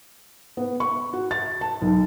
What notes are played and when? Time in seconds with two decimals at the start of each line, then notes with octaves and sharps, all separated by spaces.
0.57 B3
0.80 C#6
1.13 F#4
1.31 A6
1.61 A5
1.82 B1